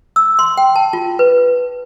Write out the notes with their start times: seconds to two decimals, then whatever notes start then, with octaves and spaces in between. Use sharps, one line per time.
0.16 E6
0.39 C6
0.57 G5
0.76 A5
0.93 F4
1.19 B4